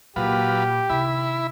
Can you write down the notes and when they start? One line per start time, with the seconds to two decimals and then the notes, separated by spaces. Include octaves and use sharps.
0.16 A#2 F#3 F4 G4 B4
0.90 C3 D#3 E4 B5